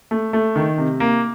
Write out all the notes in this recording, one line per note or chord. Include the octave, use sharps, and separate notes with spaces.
A3
A3
D#3
C3
A#3